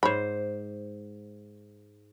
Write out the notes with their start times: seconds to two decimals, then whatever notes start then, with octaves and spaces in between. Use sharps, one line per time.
0.03 G#2 C5 C#5 B5